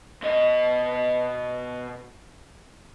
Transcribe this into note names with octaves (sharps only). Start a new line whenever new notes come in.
B2 D#5